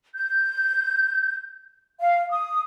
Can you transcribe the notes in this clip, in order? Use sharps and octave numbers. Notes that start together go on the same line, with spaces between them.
G6
F5
D#6